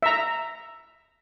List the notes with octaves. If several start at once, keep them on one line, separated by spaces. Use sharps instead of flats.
E5 A#5